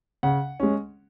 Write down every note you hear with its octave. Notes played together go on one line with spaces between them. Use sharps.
C#3 F#5
G#3 C#4